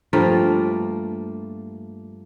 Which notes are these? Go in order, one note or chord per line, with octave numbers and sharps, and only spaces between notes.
G2 F3 A3 A#3